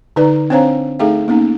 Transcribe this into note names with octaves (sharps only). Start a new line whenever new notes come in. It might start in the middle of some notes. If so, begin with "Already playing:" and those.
D3 D#4 B4 D5
C4 D4 C5 C#5 F5 A#5
A3 D#4 G#4 A4 F5 G5
A#3 B3 C#4 D#4